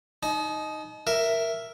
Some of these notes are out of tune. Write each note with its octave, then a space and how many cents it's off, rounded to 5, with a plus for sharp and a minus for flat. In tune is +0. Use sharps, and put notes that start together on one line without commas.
D#4 +0 A5 -45
A#4 +0 E5 +5